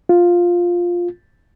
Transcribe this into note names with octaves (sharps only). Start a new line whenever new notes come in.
F4